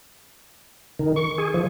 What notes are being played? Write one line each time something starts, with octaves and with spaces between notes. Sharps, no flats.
D#3
C#6
G#4
F3